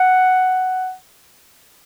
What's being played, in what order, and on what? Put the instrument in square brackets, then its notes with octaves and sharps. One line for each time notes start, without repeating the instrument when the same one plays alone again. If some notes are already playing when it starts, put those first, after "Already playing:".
Already playing: [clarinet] F#5